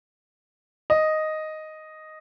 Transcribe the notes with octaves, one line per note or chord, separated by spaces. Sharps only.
D#5